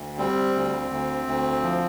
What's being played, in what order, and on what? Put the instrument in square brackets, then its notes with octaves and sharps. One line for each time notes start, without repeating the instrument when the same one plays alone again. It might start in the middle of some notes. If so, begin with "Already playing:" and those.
Already playing: [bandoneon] D2
G3 C4
D2
D2
D2
F3